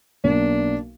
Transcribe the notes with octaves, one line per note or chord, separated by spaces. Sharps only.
B1 A#3 D4